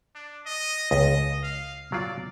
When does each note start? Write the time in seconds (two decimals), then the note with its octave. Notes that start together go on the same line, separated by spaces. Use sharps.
0.15 D4
0.46 D#5
0.91 C#2 D#5
1.43 F5
1.92 F#3 F4 D5